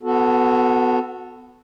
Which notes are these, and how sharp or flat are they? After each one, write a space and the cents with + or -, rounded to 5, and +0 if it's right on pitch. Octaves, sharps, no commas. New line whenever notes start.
B3 +20 F#4 -15 A4 +0